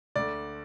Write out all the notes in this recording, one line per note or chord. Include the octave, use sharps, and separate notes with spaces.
D2 D3 D5